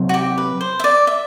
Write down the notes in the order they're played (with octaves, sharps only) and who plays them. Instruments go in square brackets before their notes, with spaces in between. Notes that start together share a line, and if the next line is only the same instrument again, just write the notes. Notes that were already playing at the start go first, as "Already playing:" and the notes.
Already playing: [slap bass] C3 F#3 C4
[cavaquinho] F#4
G4
B4
C5
E5
D5
E5